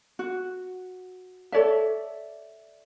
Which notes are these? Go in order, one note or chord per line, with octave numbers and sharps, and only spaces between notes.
F#4
A4 C#5 D5 E5